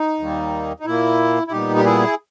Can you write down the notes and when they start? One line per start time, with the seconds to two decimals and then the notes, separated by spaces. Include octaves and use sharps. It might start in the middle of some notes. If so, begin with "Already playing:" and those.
Already playing: D#4
0.19 D#2 D#3 G3 A#3
0.80 D#4
0.86 A#2 A#3 E4
1.47 E4
1.52 A#2 G3 B3 D#4 G4
1.76 G4
1.85 E4 G#4